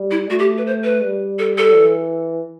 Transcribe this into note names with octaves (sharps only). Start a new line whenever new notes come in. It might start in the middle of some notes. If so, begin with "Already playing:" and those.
Already playing: G3
E4
A3 F#4
G4
B4
C5
B4
G3
A4
A4
E3